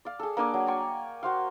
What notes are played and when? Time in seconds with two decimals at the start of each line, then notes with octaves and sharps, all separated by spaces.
0.05 D5 F5
0.19 G#4 A4
0.37 A#3 D4 G#5 D6
0.54 F#3
0.67 D5 G5 G#5 C#6
1.23 F#4 C5 F5